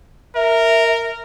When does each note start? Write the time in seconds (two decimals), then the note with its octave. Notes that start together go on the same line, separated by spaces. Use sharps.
0.36 A#4 E5